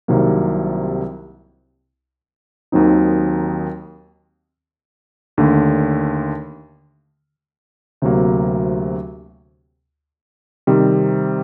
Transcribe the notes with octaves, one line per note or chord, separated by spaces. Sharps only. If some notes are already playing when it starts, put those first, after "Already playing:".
C2 C3 D#3 F#3 A#3
D#2 D#3 F#3 C4 D#4
D#2 D3 A3 D4
D2 C3 F#3 A#3
C3 D#3 G3 C4